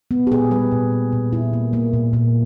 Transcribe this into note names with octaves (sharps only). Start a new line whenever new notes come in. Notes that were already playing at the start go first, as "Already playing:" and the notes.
B3
G4
A#2 G#4
G3 B4
A#2
B3
A#2
A#2 E4
A#3
A#3
A#2
A#2